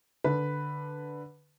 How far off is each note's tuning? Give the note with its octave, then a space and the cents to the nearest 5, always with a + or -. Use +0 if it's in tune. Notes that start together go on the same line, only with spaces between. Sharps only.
D3 +0 B4 +0